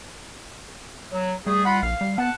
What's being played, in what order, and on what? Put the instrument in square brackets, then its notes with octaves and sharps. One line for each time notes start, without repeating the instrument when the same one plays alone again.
[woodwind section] F#3
[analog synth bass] G3 [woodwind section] A3 G#4
[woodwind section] F4 F#5 B5
[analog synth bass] A#1 [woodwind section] F5
[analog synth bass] G3
[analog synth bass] B3 [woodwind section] F#5 A5